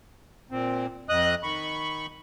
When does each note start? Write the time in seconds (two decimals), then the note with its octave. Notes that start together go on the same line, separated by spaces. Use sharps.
0.51 A#2 C4
1.09 F2 D#5 D#6 F#6
1.43 D#3 B5 C#6